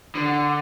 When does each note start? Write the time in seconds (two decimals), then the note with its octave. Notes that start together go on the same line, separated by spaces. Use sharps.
0.15 D3